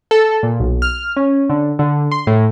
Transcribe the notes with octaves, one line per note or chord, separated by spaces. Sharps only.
A4
A#2
B1
F6
C#4
D3
D3
C6
A2